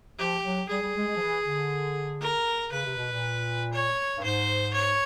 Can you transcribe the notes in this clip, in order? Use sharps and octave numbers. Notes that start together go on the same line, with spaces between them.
F3 G4
F#3
G3 G#4
G3
G#3
G#3
F3
E3
D3
A#4
C#3 B4
C3
B2
A#2
C#5
G2
G#2 C5
C#5